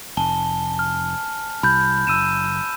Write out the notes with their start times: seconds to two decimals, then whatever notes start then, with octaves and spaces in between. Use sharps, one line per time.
0.17 F1 G#5 A5 G7
0.79 F6
1.63 C2 B5 G6
2.07 F#1 E6 D#7 E7